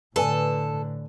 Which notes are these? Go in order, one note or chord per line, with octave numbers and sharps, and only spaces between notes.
A2 D3 A4 B4 D5 G#5